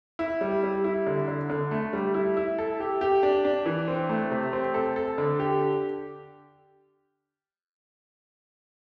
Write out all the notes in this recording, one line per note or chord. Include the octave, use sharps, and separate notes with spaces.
E4
G3
G3
E4
D3
D3
D3
A3
G3
E4
E4
A4
G4
G4
D4
D4
E3
C4
A3
C3
C4
A4
A4
D3
G4